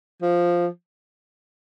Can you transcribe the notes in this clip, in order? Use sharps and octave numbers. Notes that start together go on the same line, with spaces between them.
F3